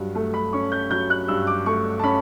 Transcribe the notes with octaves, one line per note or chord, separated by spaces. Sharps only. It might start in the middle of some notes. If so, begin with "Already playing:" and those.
Already playing: G2 F#3
A3
B5
C#4 C#6
G6
F#3 G6
F#6
G2 E6
D6
A3 C#6
A5
C#4 B5